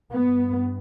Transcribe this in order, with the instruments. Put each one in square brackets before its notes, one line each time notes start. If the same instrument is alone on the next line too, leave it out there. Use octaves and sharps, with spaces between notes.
[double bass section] G2 B3